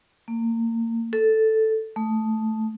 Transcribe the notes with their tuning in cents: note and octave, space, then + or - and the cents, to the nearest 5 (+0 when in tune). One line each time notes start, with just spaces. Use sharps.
A#3 -30
A4 +0
A3 -5